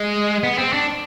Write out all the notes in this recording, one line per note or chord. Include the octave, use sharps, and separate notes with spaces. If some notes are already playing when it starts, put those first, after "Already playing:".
Already playing: G#3
B3
C4
D4